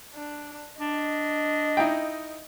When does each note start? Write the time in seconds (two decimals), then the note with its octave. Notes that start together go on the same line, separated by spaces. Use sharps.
0.15 D4
0.80 D4 D#5
1.77 D#4 E4 G5